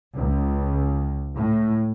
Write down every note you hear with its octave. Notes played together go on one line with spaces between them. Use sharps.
C#2
A2